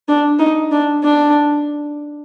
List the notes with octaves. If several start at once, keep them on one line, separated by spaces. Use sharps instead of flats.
D4
D#4
D4
D4